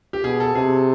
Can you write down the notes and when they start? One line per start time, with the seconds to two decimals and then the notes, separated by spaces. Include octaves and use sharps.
0.13 G4
0.24 B2 G#4
0.40 A4
0.55 C3 G#4